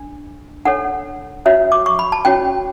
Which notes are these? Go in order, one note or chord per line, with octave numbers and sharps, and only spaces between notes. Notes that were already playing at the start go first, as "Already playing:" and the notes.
Already playing: D4
D4 A4 C#5 F#5
C#4 F#4 C#5 E5
D6
C#6
B5
A5
C#4 F#4 C#5 G5